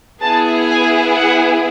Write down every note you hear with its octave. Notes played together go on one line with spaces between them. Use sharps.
B3 E4 G#4 A5
G#5
F#5